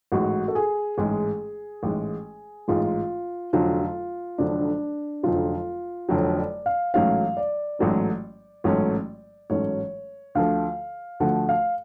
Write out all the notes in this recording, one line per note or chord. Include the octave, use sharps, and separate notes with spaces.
A1 G#2 G#3 F#4
A4
G#4
A1 G#2 G#3 G#4
A1 G#2 G#3
A1 G#2 G#3 F4
F1 F2 D3 F#3 F4
F1 F2 D3 F#3 D4
F1 F2 D3 F#3 F4
F1 F2 D3 F#3 C#5
D5
F5
A1 G#2 F#3 A3 C#4 F5
D5
A1 G#2 F#3 A3 C#4
A1 G#2 F#3 A3 C#4
A1 G#2 F#3 A3 C#4 C#5
D2 D3 F3 A3 F5
D2 D3 F3 A3 F#5
F5